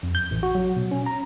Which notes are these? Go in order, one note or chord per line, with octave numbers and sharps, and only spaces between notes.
F2
G6
A1
F#4
F#3
B2
C#4
A#5